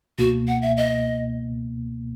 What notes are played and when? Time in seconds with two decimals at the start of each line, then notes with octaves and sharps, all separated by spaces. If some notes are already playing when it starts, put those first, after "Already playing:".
0.19 C#2 B2 A#3 F#4
0.48 F#5
0.62 E5
0.77 D#5